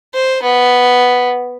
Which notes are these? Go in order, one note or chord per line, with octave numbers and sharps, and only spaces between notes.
C5
B3